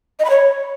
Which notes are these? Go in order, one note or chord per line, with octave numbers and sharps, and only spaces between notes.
D#5
B5
C#5